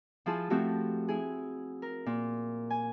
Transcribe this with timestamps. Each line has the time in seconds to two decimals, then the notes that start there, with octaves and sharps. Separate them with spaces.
0.26 F3 E4 F4 G#4 A5
0.50 F3 A3 C4 E4 F#4 G4
1.08 E4 G#4
1.82 A#4
2.06 A#2
2.70 G#5